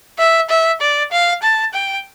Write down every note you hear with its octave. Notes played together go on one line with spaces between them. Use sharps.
E5
E5
D5
F5
A5
G5